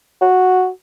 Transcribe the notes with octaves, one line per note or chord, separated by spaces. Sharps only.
F#4